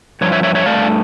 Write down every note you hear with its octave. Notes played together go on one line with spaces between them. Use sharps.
G2 F3 C#5
C#5 E5
C#5 E5
C#5 E5
G2 F3 A3 D5 F5